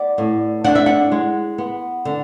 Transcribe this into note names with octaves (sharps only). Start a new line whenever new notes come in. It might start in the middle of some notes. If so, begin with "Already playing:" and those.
Already playing: B3 D5
A2
D4 F#5
E5
F#5
G#3
B3
D3